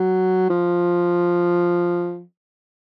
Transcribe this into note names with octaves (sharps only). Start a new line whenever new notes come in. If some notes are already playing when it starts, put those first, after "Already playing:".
Already playing: F#3
F3